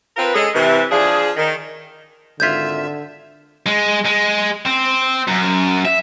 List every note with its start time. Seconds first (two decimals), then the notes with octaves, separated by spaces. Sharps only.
0.17 C4 F4 A#4 B4
0.35 G#3 C#4 G#4 A4 D#5
0.54 C3 E3
0.91 F3 D4 G#4
1.37 D#3
2.40 G#1 D3 F4 E5 G6 G#6 B6
3.66 G#3
4.06 G#3
4.66 C4
5.28 F#2
5.85 E5